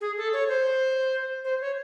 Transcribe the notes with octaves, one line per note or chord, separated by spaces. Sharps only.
G#4
A4
C#5
C5
C5
C#5